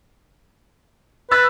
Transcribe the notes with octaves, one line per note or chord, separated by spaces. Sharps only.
B4 B5 E6 A6